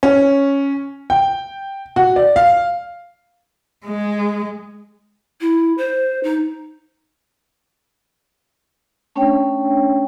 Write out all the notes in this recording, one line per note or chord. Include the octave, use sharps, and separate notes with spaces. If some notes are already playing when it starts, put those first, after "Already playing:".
C#4
G5
F#4
D5
F5
G#3
E4
C5
D#4
A3 C#4 D4 C#5 G5